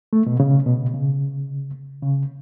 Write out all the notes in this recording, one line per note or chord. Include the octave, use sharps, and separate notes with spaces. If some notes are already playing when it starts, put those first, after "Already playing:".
A3
B2
C#3
B2
C#3
C#3